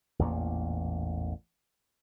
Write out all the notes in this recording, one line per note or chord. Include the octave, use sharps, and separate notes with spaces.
A1 E2 A#2 A#3